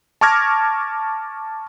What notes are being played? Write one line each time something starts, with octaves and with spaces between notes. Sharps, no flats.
A5 C#6 D6 F6 G#6 A#6